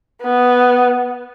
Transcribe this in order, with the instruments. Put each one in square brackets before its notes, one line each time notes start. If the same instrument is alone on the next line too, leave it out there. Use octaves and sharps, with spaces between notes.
[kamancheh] B3